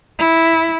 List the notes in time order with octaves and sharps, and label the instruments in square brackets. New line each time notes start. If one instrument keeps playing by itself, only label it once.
[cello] E4